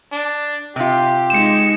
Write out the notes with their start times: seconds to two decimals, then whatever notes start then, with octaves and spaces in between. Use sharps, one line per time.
0.12 D4
0.76 C3 F4 G4
1.30 G#3 D#4 C#7 E7